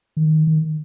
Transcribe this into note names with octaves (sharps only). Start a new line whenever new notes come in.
D#3
D#3